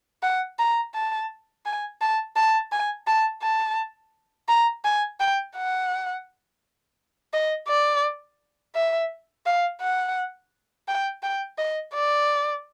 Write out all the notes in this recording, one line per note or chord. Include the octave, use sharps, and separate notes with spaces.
F#5
A#5
A5
G#5
A5
A5
G#5
A5
A5
A#5
G#5
G5
F#5
D#5
D5
E5
F5
F#5
G5
G5
D#5
D5